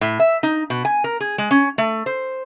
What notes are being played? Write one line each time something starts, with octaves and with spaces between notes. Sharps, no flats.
A2
E5
D#4
B2
G#5
A#4
G#4
G#3
C#4
A3
C5